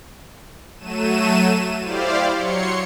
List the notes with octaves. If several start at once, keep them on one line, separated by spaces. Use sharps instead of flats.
F#3 A3 D#7 E7
E4 G4 C5 D5 F5
F#3 C#5 C6 C#7